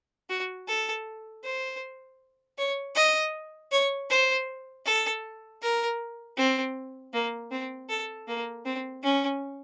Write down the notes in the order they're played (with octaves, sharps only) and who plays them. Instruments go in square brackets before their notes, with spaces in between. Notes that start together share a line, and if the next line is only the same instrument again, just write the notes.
[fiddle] F#4
A4
C5
C#5
D#5
C#5
C5
A4
A#4
C4
A#3
C4
A4
A#3
C4
C#4